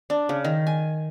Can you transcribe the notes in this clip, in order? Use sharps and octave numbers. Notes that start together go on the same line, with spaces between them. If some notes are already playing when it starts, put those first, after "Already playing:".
D4
C#3
D#3
G#5